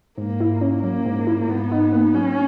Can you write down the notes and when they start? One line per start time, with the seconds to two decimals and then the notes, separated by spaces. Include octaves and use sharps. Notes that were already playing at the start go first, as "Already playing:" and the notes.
0.18 G#2 A#3
0.40 E4
0.61 C#4
0.83 F#3 A#3
1.06 G#2
1.27 E4
1.48 G#2 B3
1.71 D#4
1.93 A#3
2.14 F#3 C#4